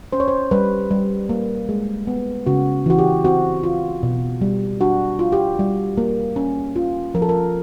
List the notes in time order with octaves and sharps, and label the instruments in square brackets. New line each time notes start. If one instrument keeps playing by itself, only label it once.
[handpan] C#4 C5
C#5
C5
G3 B4
G3
A#3
G#3
B3
C#3 F#4
E3 F#4
G4
C4 F#4
F4
B2
G3
D4 F#4
F4
G4
G3
A#3
C#4
F4
F3 A#4
A4
A#4